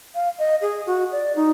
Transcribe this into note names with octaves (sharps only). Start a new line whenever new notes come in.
F5
D#5
G#4
F#4
D5
D#4